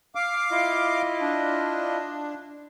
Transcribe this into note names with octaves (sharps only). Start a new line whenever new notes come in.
F5 D6
E4 F4 D#5
D4